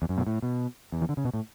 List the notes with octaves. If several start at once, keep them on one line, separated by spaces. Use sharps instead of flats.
E2
F#2
B2
A2
B2
E2
E3
D3
C#3
B2
A2